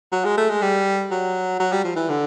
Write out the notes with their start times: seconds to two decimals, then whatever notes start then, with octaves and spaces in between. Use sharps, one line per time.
0.12 F#3
0.25 G#3
0.37 A3
0.50 G#3
0.62 G3
1.11 F#3
1.60 F#3
1.72 G3
1.84 F3
1.96 E3
2.09 D3